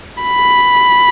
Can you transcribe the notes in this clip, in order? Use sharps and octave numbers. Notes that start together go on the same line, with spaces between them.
B5